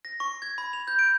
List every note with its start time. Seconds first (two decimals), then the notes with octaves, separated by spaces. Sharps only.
0.05 A#6
0.20 C#6
0.42 G#6
0.58 B5
0.73 F7
0.88 G6
0.99 D7